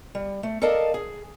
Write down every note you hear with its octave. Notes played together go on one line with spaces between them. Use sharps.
G3
A3
A4 A#4 D5 D#5 F5 A5
G#4